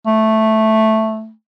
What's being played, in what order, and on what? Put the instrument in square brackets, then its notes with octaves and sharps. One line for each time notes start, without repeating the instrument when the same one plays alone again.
[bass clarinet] A3